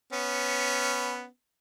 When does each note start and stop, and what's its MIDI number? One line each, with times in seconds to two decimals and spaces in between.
0.13 1.25 59
0.13 1.25 61